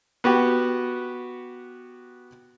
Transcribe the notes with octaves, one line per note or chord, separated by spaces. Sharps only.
B3 F#4 G4